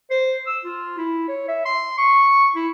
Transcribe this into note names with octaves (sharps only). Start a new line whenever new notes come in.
C5
E6
F4
E4
C#5
E5
C6
C#6
E4